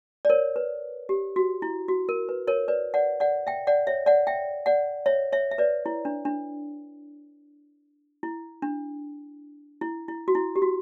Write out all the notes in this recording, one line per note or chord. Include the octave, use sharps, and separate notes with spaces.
D5
A#4 C#5
B4
G4
F#4
E4
F#4
A#4
B4
A#4 C#5
B4 D5
D5 F#5
D5 F#5
E5 G5
D5 F#5
C#5 E5
D5 F#5
E5 G5
D5 F#5
C#5 E5
C#5 E5
E5
B4 D5
E4
D4
D4
E4
D4
E4
E4
F#4
E4
G4
F#4